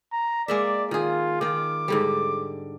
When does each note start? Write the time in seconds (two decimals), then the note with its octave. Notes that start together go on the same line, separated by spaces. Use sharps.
0.12 A#5
0.48 G#3 A#3 D5 E5
0.91 D#3 F4 G#4
1.41 D#3 F4 D6
1.88 G#2 D3 G3